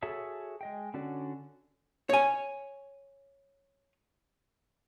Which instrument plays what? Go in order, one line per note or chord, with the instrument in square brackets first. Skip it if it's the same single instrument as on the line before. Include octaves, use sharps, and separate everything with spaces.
[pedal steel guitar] F#4 G#4 A4 C#5 E5
G#3 D#5 G5
D3 C#4 F#4 D5
[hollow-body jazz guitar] C#5 G#5